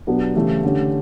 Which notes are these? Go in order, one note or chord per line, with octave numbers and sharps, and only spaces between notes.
B2 F#3 B3 D4 G4
C#3 E3 A3 E4 G4
D3 A3 C#4 G4